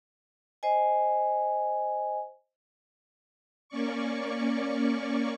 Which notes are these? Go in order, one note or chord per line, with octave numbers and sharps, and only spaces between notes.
C5 D#5 G#5
A#3 C#4 D5 C#6